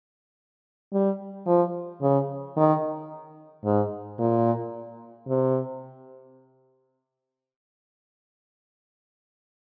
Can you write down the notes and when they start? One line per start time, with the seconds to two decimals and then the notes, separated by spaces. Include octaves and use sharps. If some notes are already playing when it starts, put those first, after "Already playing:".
0.93 G3
1.46 F3
2.02 C#3
2.56 D#3
3.64 G#2
4.19 A#2
5.28 C3